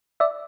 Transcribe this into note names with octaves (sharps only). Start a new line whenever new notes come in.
D5 E5